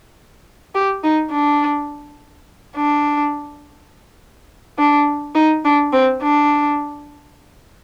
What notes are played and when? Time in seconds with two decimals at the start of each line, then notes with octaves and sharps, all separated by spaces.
0.75 G4
1.03 D#4
1.31 D4
2.76 D4
4.78 D4
5.35 D#4
5.64 D4
5.93 C4
6.22 D4